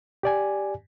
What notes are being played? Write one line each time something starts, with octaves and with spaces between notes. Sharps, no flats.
G4 D5 G#5